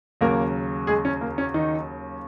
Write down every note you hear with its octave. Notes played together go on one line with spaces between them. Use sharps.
D#2 C#3 F#3 A#3 A#4
G#3 G#4
C#4
A#3
C#4
D#3 D#4